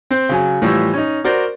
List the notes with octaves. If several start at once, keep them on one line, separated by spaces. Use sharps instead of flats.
C4 C5
C#3 F#3 G#5
A2 E3 F3 G3 C#6 E6
C#4 D#4
F#4 A#4 C5 D5